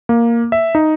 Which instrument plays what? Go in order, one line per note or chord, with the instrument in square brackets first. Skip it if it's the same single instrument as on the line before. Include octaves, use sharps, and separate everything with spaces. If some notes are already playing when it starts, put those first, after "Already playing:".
[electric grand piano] A#3
E5
D#4